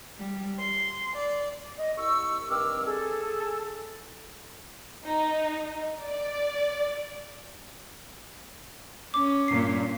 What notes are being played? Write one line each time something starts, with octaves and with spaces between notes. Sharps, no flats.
G3
C6
D5
D#5
C2 C#6 E6
G2 D#3 C4 D6 E6 F6
G#4 A4
D#4
D5
C#4 D6
G2 A#2 C7